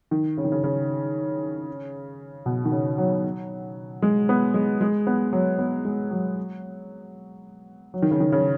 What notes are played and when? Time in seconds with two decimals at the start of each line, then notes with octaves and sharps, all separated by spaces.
0.11 D#3
0.37 C#3
0.44 D#3
0.52 C#3
0.64 C#3
2.46 B2
2.65 D#3
2.72 C#3
2.98 F#3
4.02 G#3
4.29 B3
4.54 G#3
4.81 G#3
5.07 B3
5.33 F#3
5.58 B3
5.85 G#3
6.11 F#3
7.94 F#3
8.02 D#3
8.11 C#3
8.20 D#3
8.32 C#3